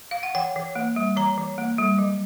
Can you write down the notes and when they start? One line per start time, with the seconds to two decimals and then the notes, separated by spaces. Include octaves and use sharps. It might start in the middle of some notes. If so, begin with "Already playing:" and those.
0.11 F5
0.23 F#5
0.35 E3 G5
0.56 E3
0.76 A#3
0.96 G3
1.16 E3 A#5
1.38 E3
1.58 A#3
1.78 G3
1.98 F#3